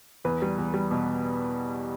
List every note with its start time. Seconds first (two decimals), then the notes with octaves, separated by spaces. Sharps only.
0.25 E2 B4
0.42 G3
0.58 E2
0.74 G3
0.91 B2